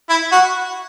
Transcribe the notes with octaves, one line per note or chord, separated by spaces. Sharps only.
E4
F#4